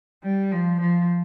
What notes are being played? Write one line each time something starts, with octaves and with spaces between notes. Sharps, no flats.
G3
F3
F3